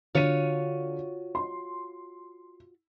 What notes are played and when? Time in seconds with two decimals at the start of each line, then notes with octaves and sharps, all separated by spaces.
0.15 D3 F4 F#4 C#5 D#7
1.35 C6